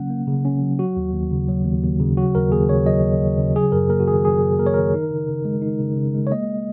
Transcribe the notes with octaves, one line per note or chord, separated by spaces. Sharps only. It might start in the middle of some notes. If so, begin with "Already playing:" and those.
Already playing: C#3 F#3 A#3 C#4 F#5
A#3
C#3
C#4
F#3
F#3 F#4
D#2
D#2
C#3
F#3
D#2
D#2
C#3
F#3 F#4
D#2 A#4
D#2 G#4
C#3 C#5
F#3 D#5
D#2
D#2
C#3
F#3 G#4
F#2 A#4
A#3 A#4
F#4
D#3 G#4
F#3 G#4
F#2
A#3 A#4
C#5
D#3 A#4
D#4
C#3
C#3
G#3
D#4
C#3
C#3
G#3
C#5
A#3 D#5